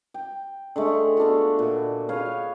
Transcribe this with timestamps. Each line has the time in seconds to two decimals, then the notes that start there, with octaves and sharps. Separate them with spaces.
0.14 G5
0.76 D3 G#3 A3
1.17 B3 D4 F4 F#4
1.59 A#2
2.09 G#4 B4 C#5 F5